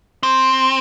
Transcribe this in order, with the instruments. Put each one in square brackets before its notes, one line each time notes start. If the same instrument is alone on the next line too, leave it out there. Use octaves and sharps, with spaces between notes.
[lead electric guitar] C4